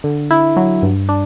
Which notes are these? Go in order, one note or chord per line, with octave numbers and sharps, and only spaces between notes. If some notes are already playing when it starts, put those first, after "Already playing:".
D3
E4
F#3
G2
D4